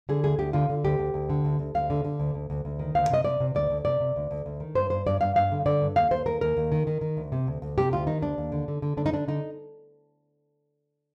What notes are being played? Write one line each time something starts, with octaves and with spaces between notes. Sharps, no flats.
D3 G#4
D2 G#4
D2 G4
D3 F4
D3
D2 G4
D2
D2
D3
D2
D2
D2 F5
D3
D3
D2
D2
D2
D2
D#3
D2 F5
C3 D#5
C3 D5
C3
D2 D5
D2
C3 D5
C3
D2
D2
D2
D#3
G2 C5
G2 C5
G2 D5
G2 F5
G2 F5
D3
D3 D5
G2
D#2 F5
D#2 C5
D#2 A#4
D#2 A#4
D#2
D#3
D#3
D#3
D2
C3
D2
D2
C3 G4
D2 F4
D#3 D#4
D2 D4
D#2
D3
D3
D3
D3 D4
D#4
D3 D4
D3 D#4